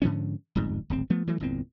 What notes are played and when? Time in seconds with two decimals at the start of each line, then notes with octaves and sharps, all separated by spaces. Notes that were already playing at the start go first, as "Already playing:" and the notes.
0.02 G#2 D3 F3 C#4
0.55 D1 G1 F2 G#2
0.90 D1 G#1 C4
1.10 F3 A3 B3
1.27 E3 F#3 A3
1.40 G1 E2 A#2 C4